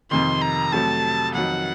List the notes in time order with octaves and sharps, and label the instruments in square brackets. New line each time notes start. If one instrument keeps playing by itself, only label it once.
[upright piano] F2 C3 D#3 [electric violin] C6
[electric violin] A#5
[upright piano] F2 C3 F#3 A3 [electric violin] A5
[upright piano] F2 D#3 F#3 [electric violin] F#5